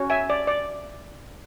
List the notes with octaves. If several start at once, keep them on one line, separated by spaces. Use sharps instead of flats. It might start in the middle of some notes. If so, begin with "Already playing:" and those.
Already playing: C#4 F#4 C#5
E5 G#5
D5
D5